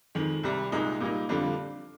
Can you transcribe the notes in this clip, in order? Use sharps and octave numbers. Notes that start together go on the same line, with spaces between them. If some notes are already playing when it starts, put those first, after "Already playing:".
F2 D#3 G#3
C2 C3 G3
C2 A#2 G#3 D#4
A#2 G3 A#3 D#4
F2 D3 G3 D4 F4